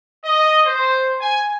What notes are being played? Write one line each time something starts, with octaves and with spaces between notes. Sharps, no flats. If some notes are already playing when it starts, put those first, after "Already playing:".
D#5
C5
G#5